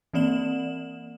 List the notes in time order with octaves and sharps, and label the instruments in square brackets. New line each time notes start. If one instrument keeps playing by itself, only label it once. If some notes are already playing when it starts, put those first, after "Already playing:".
[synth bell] E3 A#3 C4 D5 E7 F#7